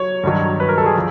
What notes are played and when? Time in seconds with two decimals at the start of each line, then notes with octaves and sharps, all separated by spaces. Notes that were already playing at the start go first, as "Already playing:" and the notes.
Already playing: F#3 C#5
0.23 G2 D#3 F#3
0.60 B4
0.68 A#4
0.78 A4
0.86 G#4
0.95 F3